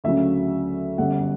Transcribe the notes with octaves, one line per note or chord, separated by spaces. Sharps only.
D2 C#3 F#3 C#4 E5
G1 F#2 C#3 G3 C#4 F#5